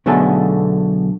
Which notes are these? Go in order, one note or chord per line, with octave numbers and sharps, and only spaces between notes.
B1 B2 D3 A3 G#4 A4